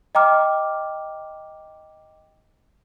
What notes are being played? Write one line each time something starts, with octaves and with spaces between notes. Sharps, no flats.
D#5 G5 A#5 D6 F6